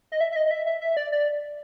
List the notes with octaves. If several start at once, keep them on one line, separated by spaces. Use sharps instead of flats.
D#5
E5
E5
D#5
D#5
E5
E5
E5
D5
D5